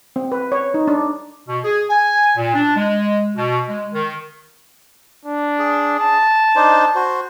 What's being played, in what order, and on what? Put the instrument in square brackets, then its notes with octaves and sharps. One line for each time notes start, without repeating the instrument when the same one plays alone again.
[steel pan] C4
B4
C#5
D#4
D4
[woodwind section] B2
G#4
G#5
A#2
D4
G#3
B2
G#3
D#3
[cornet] D4
[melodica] G#4
[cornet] A5
[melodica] D4 D#4 C5
F#4 C5